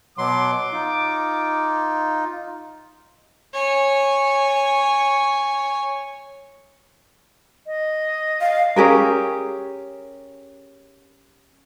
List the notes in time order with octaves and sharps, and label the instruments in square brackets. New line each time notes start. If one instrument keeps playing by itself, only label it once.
[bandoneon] B2 F#3 C6 [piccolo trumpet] D6
[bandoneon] D#4 F4
[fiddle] C#5 G#5
[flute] D#5
[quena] F5
[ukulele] C#4 G4 G#4 A#4